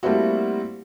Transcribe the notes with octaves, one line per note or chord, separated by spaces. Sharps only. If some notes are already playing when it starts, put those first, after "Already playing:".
G3 A3 A#3 C4 E4 F#4